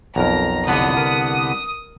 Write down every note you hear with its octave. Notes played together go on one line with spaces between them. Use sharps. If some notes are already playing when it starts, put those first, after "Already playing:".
B1 F2 A#4 A#5
C2 D3 B3 D#6
A#4